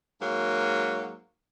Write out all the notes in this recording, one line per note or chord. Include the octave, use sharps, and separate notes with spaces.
G#2 F#3 A#3